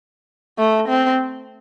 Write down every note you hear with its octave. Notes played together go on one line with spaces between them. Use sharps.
A3
C4